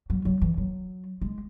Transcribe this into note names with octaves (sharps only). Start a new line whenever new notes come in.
F#3
F#3
E3
F#3
G#3